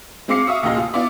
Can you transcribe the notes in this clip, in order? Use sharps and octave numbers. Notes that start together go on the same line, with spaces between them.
G#3 C4 F5 D6 C7 C#7
E5 F5 C#6 D#6 E6
F1 D#2 A#2 C#3 F4 D#5
F4
B3 E4 F4 D5 E5